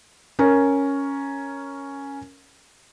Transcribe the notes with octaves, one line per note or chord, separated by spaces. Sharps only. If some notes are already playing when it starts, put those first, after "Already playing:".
C#4 A#4